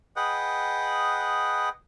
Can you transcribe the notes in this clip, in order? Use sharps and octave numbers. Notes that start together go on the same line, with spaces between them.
G#4 B4 D#5 F#5 G5